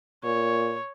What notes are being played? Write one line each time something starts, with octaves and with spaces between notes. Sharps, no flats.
A#2 C#5